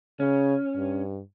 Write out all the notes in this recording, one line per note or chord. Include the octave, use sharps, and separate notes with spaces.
C#3 C#4
G2